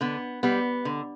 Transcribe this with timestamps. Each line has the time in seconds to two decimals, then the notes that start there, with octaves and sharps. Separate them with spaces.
0.01 D3 B3
0.43 G3 B3
0.85 D3